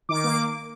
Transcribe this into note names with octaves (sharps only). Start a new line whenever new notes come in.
D#3 D6
A#3 D6